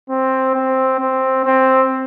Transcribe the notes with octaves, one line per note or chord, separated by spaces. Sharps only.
C4
C4
C4
C4